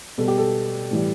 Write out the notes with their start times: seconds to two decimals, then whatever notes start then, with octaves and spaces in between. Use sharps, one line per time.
0.18 B2 G3 A4
0.28 G4
0.38 A4
0.91 A2 E3 G3